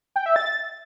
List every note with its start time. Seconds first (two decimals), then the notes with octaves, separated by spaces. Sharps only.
0.16 G5
0.26 E5
0.36 A6